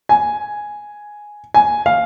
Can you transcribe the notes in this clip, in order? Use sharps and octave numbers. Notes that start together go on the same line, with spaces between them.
G#5
G#5
F5